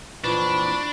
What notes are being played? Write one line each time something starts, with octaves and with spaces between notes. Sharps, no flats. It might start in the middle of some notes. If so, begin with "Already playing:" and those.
F2 A#2 E3 D4 F4 B5 C#6